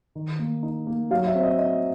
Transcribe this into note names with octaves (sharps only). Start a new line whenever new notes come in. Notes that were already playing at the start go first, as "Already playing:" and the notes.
D#3
A#3
D#4
A#3
F#3 F5
E5
C4
D#5
C4 D#5